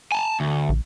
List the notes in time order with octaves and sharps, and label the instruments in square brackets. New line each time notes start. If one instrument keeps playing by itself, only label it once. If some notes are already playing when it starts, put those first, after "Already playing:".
[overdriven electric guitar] G#5 A5
D2
[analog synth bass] A#1